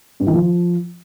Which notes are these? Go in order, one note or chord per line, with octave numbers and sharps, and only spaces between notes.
G2
D#3
F3